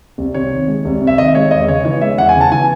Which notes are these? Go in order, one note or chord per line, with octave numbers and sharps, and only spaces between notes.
C2
C3 C#5
D#3
G#3
C2
C3
E5
D#3 D#5
G#3 C#5
E2 D#5
C#3 C#5
E3 C#5
G#3 E5
E2 F#5
G#5
C#3
A5
E3 G#5